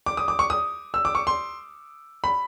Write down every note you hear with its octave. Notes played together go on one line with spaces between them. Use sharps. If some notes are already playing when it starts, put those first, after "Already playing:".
D6
D#6
D6
C#6
D#6
E6
D6
C#6
C6
B5